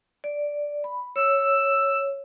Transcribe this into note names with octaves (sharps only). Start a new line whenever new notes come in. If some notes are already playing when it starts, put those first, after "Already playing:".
D5
B5
C#5 E6